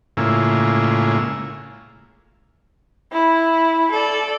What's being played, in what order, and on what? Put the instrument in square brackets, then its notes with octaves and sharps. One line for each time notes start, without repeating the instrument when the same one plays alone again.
[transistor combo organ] A2 C#3 G#3 A#3 E4 F4
[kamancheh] E4
A4 D5